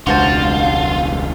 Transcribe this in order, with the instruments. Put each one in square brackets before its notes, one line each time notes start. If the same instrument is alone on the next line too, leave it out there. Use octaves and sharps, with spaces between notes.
[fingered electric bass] E1 C#2 D4 [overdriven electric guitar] F4 [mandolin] F#4 C5 A5